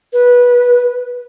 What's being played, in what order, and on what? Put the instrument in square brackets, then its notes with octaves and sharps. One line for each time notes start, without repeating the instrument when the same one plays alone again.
[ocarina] B4